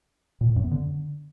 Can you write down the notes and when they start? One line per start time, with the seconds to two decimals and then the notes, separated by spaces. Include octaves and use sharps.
0.41 A#2
0.48 A2
0.56 F#2
0.64 B3
0.71 D3